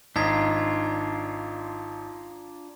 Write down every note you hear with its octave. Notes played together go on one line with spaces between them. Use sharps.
G#1 D4 D#4 F4 A#5 G#6 B6